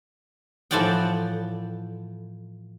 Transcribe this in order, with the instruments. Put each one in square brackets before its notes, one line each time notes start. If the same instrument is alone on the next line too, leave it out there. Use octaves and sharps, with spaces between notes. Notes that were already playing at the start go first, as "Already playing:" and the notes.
[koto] A2 E3 F3 D5 F#5 G5